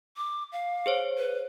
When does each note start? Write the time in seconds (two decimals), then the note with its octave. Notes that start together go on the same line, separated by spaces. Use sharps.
0.17 D6
0.52 F5
0.86 G#4 C5 C#5
1.18 B4